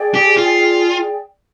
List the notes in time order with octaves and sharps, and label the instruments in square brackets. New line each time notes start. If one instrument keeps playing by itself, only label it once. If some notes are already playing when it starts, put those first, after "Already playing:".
Already playing: [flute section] G#4 D5 G5
[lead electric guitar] G4
F4